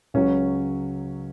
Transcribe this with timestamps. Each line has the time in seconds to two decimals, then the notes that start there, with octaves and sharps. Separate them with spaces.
0.14 C#2 C#3 F#3 C#4